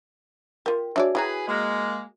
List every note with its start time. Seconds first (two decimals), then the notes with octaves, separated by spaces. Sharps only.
0.66 F4 G4 A#4
0.96 D4 F#4 G#4 C#5 D5 E5
1.15 E4 F#4 G#4 B4 G5 A#5
1.47 G#3 A#3